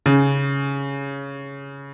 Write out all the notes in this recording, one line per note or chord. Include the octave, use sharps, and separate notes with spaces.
C#3